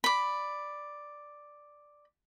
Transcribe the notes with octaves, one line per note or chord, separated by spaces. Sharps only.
D5 B5